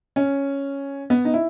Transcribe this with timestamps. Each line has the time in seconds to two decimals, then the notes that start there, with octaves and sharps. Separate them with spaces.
0.16 C#4
1.10 B3
1.25 D#4
1.34 E4